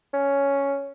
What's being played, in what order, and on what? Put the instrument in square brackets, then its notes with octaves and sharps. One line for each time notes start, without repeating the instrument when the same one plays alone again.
[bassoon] C#4